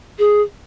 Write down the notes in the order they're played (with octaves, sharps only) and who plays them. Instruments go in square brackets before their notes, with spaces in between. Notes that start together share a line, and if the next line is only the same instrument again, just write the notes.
[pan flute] G#4